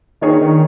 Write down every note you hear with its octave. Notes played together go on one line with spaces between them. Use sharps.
D#3 A#3 D4 F4 G#4 C#5
D#3